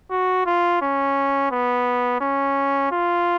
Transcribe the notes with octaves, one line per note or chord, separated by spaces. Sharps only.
F#4
F4
C#4
B3
C#4
F4